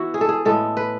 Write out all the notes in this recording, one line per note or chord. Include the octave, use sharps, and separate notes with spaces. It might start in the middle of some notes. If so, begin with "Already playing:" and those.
Already playing: E3 B3 E4 F#4
G#4
A4
G#4
A2 G#3 B3 A4
B4